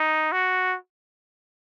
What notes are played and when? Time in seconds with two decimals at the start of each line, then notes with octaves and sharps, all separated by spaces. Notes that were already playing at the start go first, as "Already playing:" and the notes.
Already playing: D#4
0.32 F#4